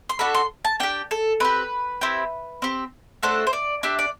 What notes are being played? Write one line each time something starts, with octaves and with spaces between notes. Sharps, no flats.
C6
D4 F#4 A4 B5
C6
A5
D4 G4 G5
A4
C4 G4 B4
C4 E4 G4
C4 G4
A3 D4 F#4 A4 C5
C5
D5
D4 G4 E5
D5